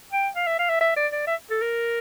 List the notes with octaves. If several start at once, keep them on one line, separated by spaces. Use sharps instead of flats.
G5
F5
E5
F5
E5
E5
D5
D5
E5
A4
A#4